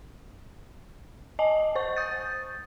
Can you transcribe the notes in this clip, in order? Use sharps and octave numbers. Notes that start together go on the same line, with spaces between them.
D#5 G#5 A5
C5 C#6
D#6 G6 A6